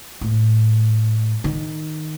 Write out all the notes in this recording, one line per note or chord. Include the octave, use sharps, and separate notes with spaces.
A2
D#3